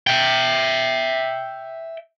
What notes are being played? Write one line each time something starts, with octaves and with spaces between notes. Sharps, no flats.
E5 G5